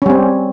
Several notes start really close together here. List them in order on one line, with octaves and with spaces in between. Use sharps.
C#4 G3 C4